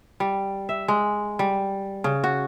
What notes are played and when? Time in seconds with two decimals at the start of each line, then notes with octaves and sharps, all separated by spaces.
0.20 G3
0.69 E5
0.88 G#3
1.39 G3
2.04 C#3
2.24 F#4